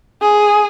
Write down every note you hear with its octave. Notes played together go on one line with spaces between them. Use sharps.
G#4